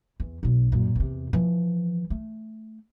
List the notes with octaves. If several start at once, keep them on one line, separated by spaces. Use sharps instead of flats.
E2
B1 B2
F#2 A#2
E2 C3
E3 F3
A3